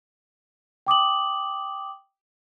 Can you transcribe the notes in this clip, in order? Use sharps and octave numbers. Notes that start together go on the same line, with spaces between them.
G5 D6 D#6 F#7